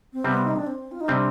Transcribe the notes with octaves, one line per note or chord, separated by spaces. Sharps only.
C4
C3 G3 B3 C4
D#4
D4
C4
F4
D#4
C3 G3 C4 D4